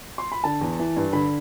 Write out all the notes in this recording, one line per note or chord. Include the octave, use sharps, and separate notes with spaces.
C6
B5
D3 A5
E2
E3
G2
D3 B5